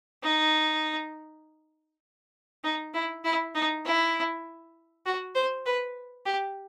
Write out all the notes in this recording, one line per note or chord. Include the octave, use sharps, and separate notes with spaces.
D#4
D#4
E4
E4
D#4
E4
F#4
C5
B4
G4